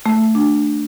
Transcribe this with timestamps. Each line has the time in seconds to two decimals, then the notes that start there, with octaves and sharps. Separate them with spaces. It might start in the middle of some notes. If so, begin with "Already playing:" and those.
0.06 A3
0.35 D4